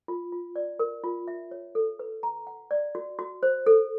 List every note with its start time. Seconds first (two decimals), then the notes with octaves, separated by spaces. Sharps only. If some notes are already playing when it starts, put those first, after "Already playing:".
0.08 F4
0.32 F4
0.56 D5
0.79 A#4
1.04 F4
1.28 E5
1.51 C#5
1.75 A4
1.99 B4
2.23 A#5
2.47 F#5
2.71 D5
2.95 F#4
3.19 F#4
3.43 C5
3.66 A4